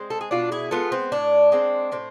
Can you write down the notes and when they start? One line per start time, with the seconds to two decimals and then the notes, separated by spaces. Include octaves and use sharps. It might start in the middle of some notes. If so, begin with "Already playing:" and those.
Already playing: G#3 C4
0.10 A4
0.21 G#4
0.31 B2 D4 F4
0.52 E4 G#4
0.71 G#3 B3 F4 A4
0.92 C4
1.12 A2 D4
1.52 G#3 C4
1.92 A2 C4